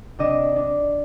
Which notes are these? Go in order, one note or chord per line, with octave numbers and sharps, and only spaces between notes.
C3 D4 D#5 E7
D4